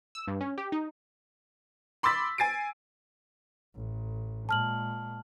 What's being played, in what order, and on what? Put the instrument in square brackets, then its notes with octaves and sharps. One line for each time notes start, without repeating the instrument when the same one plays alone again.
[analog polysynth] E6
G2
C#4
G4
D#4
[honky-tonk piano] B5 C6 D6 E6 A6 B6
G#5 A6 C7 D7
[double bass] A1
[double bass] A#2 G#3 [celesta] A5 F6 F#7